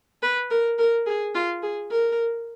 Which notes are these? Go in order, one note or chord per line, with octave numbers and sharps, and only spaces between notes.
B4
A#4
A#4
G#4
F4
G#4
A#4